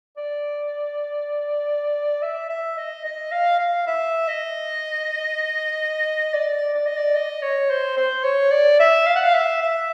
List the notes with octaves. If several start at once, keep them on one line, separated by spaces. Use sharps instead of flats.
D5
E5
E5
D#5
D#5
F5
F5
E5
D#5
D5
D5
D#5
D5
D#5
C#5
C5
C5
C#5
D5
E5
F5
F#5
F5
E5
E5